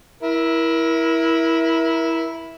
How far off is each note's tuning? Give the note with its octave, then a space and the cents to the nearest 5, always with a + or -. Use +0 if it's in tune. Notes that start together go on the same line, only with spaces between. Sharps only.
E4 -5 A#4 +25